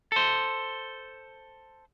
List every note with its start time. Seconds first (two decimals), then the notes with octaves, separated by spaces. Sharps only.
0.12 A4 C5